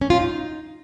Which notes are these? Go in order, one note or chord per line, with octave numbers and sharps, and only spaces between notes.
C#4
F4
D#4